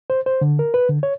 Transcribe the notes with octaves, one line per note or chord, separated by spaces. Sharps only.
C5
C5
D3
A#4
B4
D3
C#5